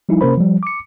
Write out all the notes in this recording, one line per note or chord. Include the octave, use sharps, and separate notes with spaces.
F3 G3 D#4 E4
C3 A#3 C#4 A#4 C5 B5
F3 G3
D6 C#7